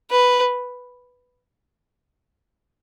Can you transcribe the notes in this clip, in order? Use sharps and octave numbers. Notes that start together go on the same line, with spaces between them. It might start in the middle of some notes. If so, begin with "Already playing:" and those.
B4